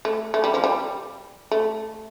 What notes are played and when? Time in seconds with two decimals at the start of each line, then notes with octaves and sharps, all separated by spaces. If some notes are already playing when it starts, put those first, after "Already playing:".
0.05 A3
0.34 A3
0.44 G3
0.54 F3
0.64 G3
1.51 A3